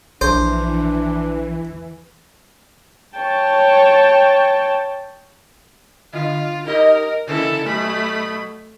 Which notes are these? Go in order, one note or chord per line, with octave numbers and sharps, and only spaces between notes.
A#1 E3 D4 C5
C#5 G5 A5
D3 F4
D#4 G4 A#4 D#5
C#3 E3 A#3 E4 A4
B2 F#3 A3 B5